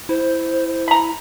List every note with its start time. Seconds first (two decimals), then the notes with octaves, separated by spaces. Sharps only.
0.09 E4 C5
0.88 A#5 B5